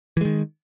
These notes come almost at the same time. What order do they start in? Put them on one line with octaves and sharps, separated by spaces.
E3 G#3 D#3